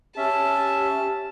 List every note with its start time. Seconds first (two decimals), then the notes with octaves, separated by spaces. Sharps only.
0.17 C#4 G4 E5 A5